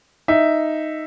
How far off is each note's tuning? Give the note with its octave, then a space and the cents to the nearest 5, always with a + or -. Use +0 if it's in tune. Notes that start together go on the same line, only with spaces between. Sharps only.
D#4 +0 E5 +0